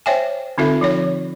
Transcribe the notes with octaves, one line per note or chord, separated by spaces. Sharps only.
C5 C#5 E5 G5 G#5
D3 C4 D#4 F4 A4 E5
F3 D#4 C#5